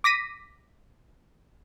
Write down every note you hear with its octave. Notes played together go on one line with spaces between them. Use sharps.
D6 A#6 B6 D#7